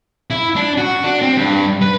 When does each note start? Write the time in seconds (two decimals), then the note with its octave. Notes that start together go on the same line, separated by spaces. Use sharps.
0.31 E4
0.56 D4
0.78 F#4
1.04 D4
1.21 C4
1.37 G2
1.82 B4